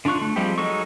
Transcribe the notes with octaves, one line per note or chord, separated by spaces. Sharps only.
D3 D4 F4 C#6 F#6
A3
F3 G3 G#3 C4 G4
F#3 G#3 D#4 A4 C#6